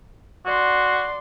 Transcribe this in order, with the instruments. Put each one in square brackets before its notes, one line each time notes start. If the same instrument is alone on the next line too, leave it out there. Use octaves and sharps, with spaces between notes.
[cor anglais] F#4 [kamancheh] D5 C6